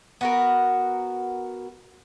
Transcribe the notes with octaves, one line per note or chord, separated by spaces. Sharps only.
B3 F#4 A#4